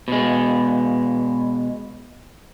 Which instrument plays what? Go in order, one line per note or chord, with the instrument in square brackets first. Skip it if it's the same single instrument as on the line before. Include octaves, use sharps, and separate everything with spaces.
[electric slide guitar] B2 G#3